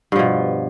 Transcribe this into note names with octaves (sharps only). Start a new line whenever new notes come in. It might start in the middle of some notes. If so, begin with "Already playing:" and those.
G2 B2 F3